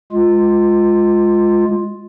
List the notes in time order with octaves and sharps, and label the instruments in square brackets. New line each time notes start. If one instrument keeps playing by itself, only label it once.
[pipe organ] G#3 F4